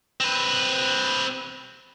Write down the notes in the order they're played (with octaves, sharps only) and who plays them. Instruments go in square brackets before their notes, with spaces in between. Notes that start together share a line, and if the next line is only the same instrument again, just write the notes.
[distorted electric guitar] C4 B4